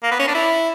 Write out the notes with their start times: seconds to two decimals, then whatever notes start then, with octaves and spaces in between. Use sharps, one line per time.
0.03 A#3
0.12 B3
0.20 C#4
0.28 D4
0.35 E4